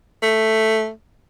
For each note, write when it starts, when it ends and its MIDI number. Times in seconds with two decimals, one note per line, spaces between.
0.23 0.90 57